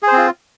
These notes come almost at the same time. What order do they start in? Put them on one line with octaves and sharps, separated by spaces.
G#4 C5 C4 F4